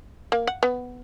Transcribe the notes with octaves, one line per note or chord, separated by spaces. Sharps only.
A#3
F#5
B3